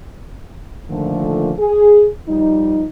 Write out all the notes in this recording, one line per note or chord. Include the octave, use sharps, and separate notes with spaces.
A#2 D3 D#3 F3 A3
G#4
F3 G3 D#4